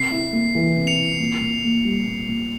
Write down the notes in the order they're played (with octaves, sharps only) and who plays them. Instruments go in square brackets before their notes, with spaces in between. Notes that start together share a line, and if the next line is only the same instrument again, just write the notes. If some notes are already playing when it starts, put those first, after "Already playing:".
Already playing: [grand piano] C3 [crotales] C7
[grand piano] E4
A#3
E3
C3
[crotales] C#7 F7
[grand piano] E4
A#2
A#2
A#3
G3
A#2
A#2